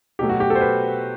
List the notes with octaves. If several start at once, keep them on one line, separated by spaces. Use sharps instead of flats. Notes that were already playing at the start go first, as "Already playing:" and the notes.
B2 F#3 A3 G4
F#4
G4
A4
C5
B4